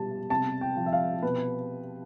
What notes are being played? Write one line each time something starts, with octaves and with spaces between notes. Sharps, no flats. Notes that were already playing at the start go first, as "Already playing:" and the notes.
Already playing: B2 G3 A5
C3 A5
G5
F3
E5
F5
B2 B4